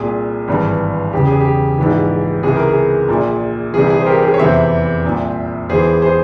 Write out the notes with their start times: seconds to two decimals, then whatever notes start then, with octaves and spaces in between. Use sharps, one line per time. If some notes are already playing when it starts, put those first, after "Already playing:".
Already playing: C2 A#2 G#4
0.48 G#1 G2 E3
1.13 E1 E2 C#3 G4
1.27 G#4
1.41 G4
1.78 A#1 G#2 E3
2.43 C#2 C3 E3 G#4
2.56 A#4
2.68 G#4
3.09 A#1 A#2
3.73 C2 C3 E3 G#4
3.90 G#4
4.01 C5
4.06 G4 A#4
4.23 G#4 C5
4.34 C#5
4.39 F1 E2 C3 E3 C5 E5
5.04 C2 A#2
5.69 E1 E2 E3 G#4 C5
6.02 G#4 C5